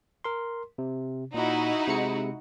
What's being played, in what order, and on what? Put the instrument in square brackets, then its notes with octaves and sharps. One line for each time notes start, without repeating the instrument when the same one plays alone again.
[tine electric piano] A#4 C6
C3
[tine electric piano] A#2 [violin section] D#4 E4 F#4
[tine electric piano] C3 G#3 C#7